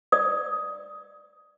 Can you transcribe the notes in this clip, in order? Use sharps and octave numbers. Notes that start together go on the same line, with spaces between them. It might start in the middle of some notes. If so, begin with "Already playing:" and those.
D5 D#6